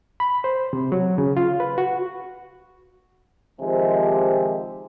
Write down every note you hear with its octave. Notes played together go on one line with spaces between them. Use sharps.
B5
C5
C3
F#3
C#3
F4
B4
F#4
C3 D#3 F3 G#3 G4